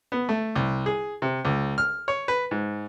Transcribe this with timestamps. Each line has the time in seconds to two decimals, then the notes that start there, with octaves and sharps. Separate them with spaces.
0.12 B3
0.29 A3
0.56 C2
0.86 G#4
1.22 C3
1.45 C#2
1.78 F6
2.08 C#5
2.28 B4
2.51 G#2